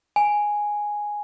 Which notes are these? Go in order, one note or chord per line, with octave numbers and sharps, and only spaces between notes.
G#5